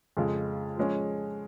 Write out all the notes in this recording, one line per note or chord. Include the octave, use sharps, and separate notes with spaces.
F2 C#3 G#3 F4
F3 G#3 C#4 G#4